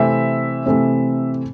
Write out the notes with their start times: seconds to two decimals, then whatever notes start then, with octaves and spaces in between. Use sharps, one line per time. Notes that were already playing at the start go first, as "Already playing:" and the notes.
Already playing: C3 E3 A3 C4 E5
0.66 C3 E3 A3 C4